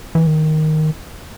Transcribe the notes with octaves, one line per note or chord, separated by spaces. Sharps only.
E3
D#3